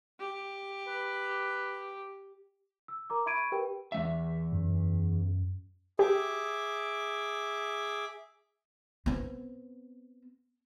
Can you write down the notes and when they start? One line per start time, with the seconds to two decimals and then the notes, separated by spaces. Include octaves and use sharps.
0.19 G4
0.88 B4
2.88 E6
3.10 A#4 A#5 D6
3.26 E5 B5 C#6 G#6 D7 D#7
3.52 G4 A#4 B4 G5
3.92 E2 G#3 E5
4.53 F#2
5.99 G4 G#4 E5 D6
9.06 B3 C4